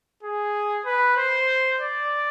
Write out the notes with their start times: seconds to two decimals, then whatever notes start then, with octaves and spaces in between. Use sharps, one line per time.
0.23 G#4
0.85 B4
1.17 C5
1.80 D5